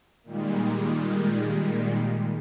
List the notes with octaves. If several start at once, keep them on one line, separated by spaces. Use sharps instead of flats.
A#2 D#3 G3 G#3